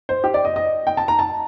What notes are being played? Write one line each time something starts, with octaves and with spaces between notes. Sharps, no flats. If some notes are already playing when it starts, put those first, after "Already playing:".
C5
G4
D5
D#5
D#5
G5
A5
A#5
A5